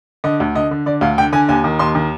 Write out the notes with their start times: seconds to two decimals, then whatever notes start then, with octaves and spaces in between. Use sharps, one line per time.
0.24 D3 D#5
0.40 D2
0.55 D3 D#5
0.71 D3
0.86 D3 D5
1.01 D2 F5
1.18 D3 G5
1.32 D3 G#5
1.49 D#2 G#5
1.64 D#3
1.79 D#2 C6
1.95 D#3